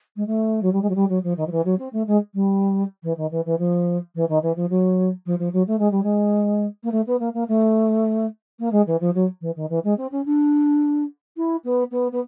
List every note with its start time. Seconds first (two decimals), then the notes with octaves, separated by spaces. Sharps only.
0.16 G#3
0.27 A3
0.62 F#3
0.73 G3
0.82 G#3
0.89 F#3
0.95 G3
1.09 F#3
1.23 F3
1.37 D#3
1.47 F3
1.52 E3
1.65 F#3
1.79 C4
1.93 A3
2.07 G#3
2.34 G3
3.03 E3
3.17 D#3
3.31 E3
3.45 E3
3.59 F3
4.15 E3
4.29 D#3
4.42 E3
4.56 F3
4.70 F#3
5.26 F3
5.39 F3
5.53 F#3
5.67 A3
5.79 G#3
5.91 G3
6.03 G#3
6.83 A#3
6.92 A3
7.07 B3
7.20 A#3
7.34 A#3
7.48 A3
8.59 A#3
8.72 G#3
8.87 E3
9.01 F3
9.15 F#3
9.41 E3
9.56 D#3
9.69 E3
9.84 G#3
9.97 C4
10.12 C#4
10.26 D4
11.37 E4
11.64 B3
11.91 B3
12.12 B3